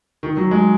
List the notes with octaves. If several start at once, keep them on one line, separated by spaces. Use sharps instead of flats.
D#3
F#3
G#3